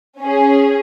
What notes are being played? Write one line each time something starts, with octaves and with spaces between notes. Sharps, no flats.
C#4 G#4